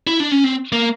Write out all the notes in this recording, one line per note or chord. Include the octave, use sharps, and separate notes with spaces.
E4
D4
C#4
C4
A#3